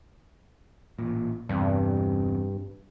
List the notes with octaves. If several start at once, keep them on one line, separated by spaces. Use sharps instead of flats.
A1 A#2
G1 E2 G2 C3